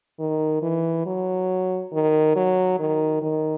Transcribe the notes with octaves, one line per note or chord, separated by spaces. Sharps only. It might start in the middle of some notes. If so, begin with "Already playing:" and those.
D#3
E3
F#3
D#3
F#3
D#3
D#3